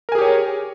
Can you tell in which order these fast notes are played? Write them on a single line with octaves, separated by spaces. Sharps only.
A#4 G#5 G#4 G4 C#5